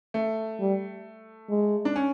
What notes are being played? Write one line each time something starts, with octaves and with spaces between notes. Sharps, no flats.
A3
G3
G#3
D4
C#4